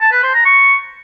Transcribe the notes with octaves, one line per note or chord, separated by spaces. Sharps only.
A5
B4
C5
A#5
C#6